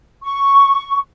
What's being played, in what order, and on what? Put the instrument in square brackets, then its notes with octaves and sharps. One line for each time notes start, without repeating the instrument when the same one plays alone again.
[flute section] C#6